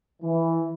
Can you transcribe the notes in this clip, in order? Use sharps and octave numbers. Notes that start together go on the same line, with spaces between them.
E3